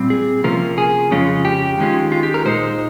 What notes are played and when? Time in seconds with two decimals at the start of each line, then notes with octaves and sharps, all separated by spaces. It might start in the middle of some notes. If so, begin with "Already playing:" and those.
Already playing: A#2 G3 C4
0.10 G#4
0.44 C3 F3 A#3 C#4 F4 A#4
0.78 G#4
1.11 F2 C#3 G#3 C#4 F4
1.45 G4
1.78 D#3 G#3 C#4 F4
2.12 F4
2.23 G4
2.34 A#4
2.45 A#2 G#3 D#4 C5